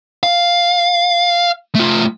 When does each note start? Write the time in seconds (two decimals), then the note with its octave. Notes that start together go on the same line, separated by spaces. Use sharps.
0.23 F5
1.75 A3 F4